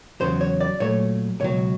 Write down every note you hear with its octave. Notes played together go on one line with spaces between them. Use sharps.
E2 C#3 F#3 C5
C#5
D5
A#2 F#3 A3 C#5
C#2 B2 F#3 C#5